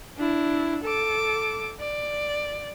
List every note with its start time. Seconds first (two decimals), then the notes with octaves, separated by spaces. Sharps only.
0.17 D4 E4
0.83 A4 D6
1.79 D5